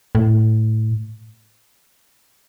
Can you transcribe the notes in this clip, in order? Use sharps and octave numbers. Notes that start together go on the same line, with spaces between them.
A2